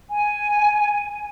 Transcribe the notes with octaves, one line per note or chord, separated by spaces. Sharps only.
G#5